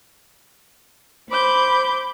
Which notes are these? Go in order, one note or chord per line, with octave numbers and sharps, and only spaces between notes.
C5 B5 D6 G6